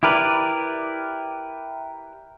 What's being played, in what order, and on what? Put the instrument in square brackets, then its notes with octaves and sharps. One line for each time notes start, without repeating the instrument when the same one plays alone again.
[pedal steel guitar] E4 G4 A#4 B4 D5